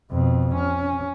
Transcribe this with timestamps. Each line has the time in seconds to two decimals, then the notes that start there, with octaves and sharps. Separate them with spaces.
0.11 F2 B2
0.55 C#4